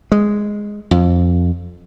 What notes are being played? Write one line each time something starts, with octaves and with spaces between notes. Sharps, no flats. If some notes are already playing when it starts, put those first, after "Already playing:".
G#3
F2